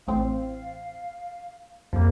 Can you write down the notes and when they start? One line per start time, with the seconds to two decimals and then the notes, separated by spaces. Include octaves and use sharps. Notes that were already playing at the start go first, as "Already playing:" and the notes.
0.07 A1 A2 C4 F5
1.93 F2 F3 G3 A#3